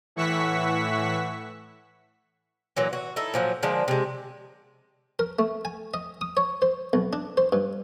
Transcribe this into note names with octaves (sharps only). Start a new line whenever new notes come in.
A2 E3 F#5 C#6 E6 B6
A#2 E3 F#3
F#4
D#4 E4 A4
A#2 F3 F#3
D3 F3 G#3 A#3
C3 G#3
A#4
A3
G#5
D#5
D#6
C#5
C5
B1
D4
C5
G2